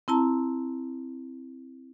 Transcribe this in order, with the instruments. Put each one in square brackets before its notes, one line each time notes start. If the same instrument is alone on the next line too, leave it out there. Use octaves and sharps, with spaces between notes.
[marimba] C4 E4 A5 A#5